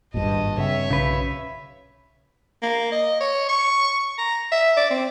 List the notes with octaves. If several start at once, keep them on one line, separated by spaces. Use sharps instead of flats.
G#1 G2 A#2 D#5 A5
C#3 B3 C4 C#5 E5
B1 C#3 B4
A#3
D#5
C#5
C#6
A#5
E5
D5
C4